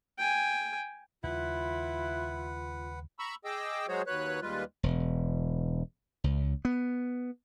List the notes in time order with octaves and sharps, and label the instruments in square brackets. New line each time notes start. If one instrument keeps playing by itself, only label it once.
[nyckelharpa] G5 G#5
[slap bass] D#2 C#3 G3 [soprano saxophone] E4 [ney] F4 [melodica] B4 F#5
[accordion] A#5 B5 C#6 E6
G#4 D#5 G5 D6 E6
F#3 G#3 F#4 G#4 C5 C#5
D#2 F#3 B4 C#5 F#6
D#2 G3 G#3 F4 B4
[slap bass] E1
C#2
B3